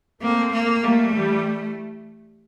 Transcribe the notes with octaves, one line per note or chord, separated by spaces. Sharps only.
A3 A#3 C4
A#3
G3 A3 A#3
E3 G3